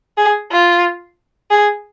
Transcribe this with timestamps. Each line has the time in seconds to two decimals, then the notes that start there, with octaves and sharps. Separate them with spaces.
0.17 G#4
0.51 F4
1.51 G#4